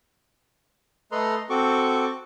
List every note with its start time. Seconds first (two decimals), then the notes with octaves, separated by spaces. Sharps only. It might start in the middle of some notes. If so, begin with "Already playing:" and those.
1.12 A3 A4 B4 D#5 A#5 C6
1.50 C4 F#4 A4 C#6 D6